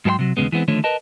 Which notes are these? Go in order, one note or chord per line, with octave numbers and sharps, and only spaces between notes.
G#2 F#3 G#4 A#4 G5 C6
C3 F#3
D#2 A#2 C#3 G#3 B3
E3 G#3 B3 C4
D3 D#3 F3 A3 C#5
A#4 B4 D#5 A5